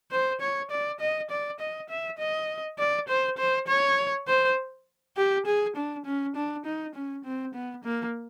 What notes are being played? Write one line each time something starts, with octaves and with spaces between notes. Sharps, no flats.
C5
C#5
D5
D#5
D5
D#5
E5
D#5
D5
C5
C5
C#5
C5
G4
G#4
D4
C#4
D4
D#4
C#4
C4
B3
A#3